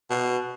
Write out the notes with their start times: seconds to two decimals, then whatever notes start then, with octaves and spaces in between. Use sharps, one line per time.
0.10 B2